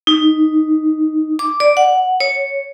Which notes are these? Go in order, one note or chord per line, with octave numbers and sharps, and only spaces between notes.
D#4
D6
D5
F#5
C#5